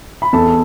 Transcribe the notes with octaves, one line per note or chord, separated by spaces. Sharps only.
B5
E2 A4 A5